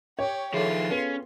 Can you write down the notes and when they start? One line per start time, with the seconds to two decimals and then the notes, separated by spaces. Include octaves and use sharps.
0.19 G4 C#5
0.53 D#3 F3 E4 F4 G#4 A4 C6
0.90 B3 C#4